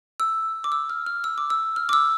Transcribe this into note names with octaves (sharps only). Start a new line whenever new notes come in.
E6
D6
E6
F6
F6
E6
D6
E6
F6
D6
E6